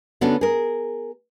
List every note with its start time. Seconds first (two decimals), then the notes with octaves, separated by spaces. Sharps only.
0.21 D3 B3 C#4 D4 F#4 A4
0.41 G#4 A#4